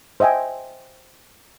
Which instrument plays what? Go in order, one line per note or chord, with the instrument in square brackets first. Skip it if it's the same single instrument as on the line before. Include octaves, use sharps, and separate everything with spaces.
[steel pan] C5 D#5 E5 G5 G#5